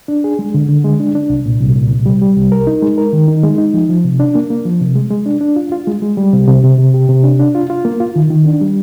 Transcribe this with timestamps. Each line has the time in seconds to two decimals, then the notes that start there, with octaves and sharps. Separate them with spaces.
0.08 D4
0.24 G#4
0.39 G#3
0.54 D3
0.69 D3
0.84 G#3
1.00 D4
1.15 D4
1.30 C2
1.46 A#2
1.60 C2
1.75 A#2
1.91 C2
2.06 G3
2.22 G3
2.36 C2
2.52 A#4
2.67 D#4
2.82 G#3
2.98 A#4
3.13 D#3
3.28 D#4
3.43 G#3
3.58 D#4
3.74 F3
3.89 F3
4.04 C3
4.20 D4
4.35 A#3
4.50 A#3
4.65 F3
4.81 C3
4.95 G#3
5.11 G#3
5.26 D4
5.41 D4
5.56 F4
5.72 F4
5.87 G#3
6.02 G#3
6.17 G3
6.33 C3
6.48 C3
6.63 C3
6.79 C3
6.94 G4
7.09 C3
7.24 D4
7.39 D4
7.55 F4
7.70 F4
7.85 A#3
8.00 F4
8.16 D#3
8.31 D#3
8.46 D4
8.61 G3